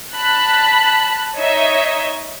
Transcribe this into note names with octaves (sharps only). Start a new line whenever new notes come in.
A5 B5 F#6
D#4 C#5 D#5 E5